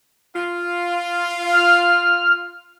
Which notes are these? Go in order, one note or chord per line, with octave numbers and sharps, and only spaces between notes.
F4
F6